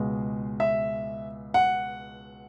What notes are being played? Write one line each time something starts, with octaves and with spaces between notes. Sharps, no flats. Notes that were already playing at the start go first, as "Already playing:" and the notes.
Already playing: C#2 B2 G#3
E5
F#5